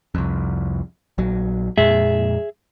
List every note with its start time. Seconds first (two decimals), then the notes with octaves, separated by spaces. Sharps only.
0.15 C2 F2
1.18 A#1 F#3
1.78 F2 A#2 G#3 G#4 E5